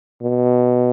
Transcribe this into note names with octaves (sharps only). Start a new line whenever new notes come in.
B2